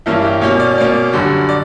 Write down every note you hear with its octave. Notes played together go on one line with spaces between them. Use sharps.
G2 E3 A#3 C#4 E4
G4
B2 A#3 C#4 C#5
D5
B2 A#3 C#4 D5
F#2 D3 G3
D5